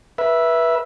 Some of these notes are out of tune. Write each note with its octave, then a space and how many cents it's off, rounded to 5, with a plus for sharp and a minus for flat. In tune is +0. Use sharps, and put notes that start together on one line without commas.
B4 -25 E5 +0